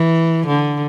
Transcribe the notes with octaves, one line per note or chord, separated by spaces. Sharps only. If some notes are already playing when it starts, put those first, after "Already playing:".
Already playing: E3
D3